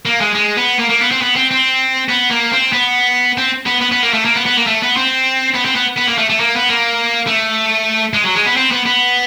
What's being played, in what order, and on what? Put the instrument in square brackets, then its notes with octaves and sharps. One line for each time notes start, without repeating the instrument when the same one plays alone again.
[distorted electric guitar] A#3
G#3
G#3
B3
A#3
A#3
B3
C4
B3
C4
C4
B3
A#3
C4
B3
C4
B3
B3
B3
A#3
A3
A#3
B3
B3
A#3
A3
B3
C4
B3
C4
B3
B3
A#3
A3
A3
A#3
B3
A#3
A3
G#3
F#3
G#3
B3
C4
B3
B3